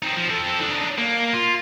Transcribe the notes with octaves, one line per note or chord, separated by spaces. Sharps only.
C4 D#4
F3
C4 A4
D4 D#4
A#3
F4